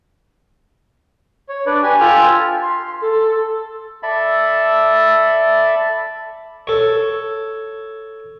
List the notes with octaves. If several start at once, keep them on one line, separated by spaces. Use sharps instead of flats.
C#5
D4 B4 D5
G4 G#5
F4 G4 A4 G5 G#5 F6
C6
A4
A4 D5 E5 A5 B5
A4 C#5